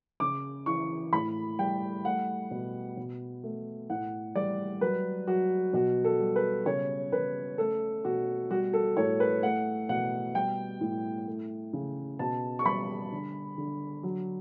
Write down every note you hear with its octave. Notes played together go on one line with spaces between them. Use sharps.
C#3 D6
E3 C#6
A2 B5
G3 G5
A3 F#5
B2
B2
A3
A2 F#5
G3 D5
F#3 B4
F#3 F#4
B2 F#4
A4
G3
B4
C#3 C#5
C#3 B4
A3 A4
B2 F#4
G3 F#4
A4
A2 C#5
B4
A3 F#5
B2 F#5
G3 G5
A2
A3
C#3
B2 A5
C#6
G3 B5
D3
D3
F#3